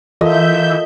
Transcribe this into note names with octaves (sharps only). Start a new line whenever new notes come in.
E3 F4 A4 A#4 D#5 E5 G6